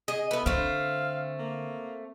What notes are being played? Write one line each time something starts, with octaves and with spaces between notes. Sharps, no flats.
G#4 D#5
A3 B3 B4
D3 A3 C4 F5
A#3